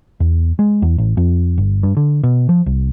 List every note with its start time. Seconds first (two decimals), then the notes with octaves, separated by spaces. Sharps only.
0.20 E2
0.59 G#3
0.82 E2
0.98 A1
1.17 F2
1.58 G1
1.83 G2
1.97 D3
2.23 B2
2.49 F3
2.66 C2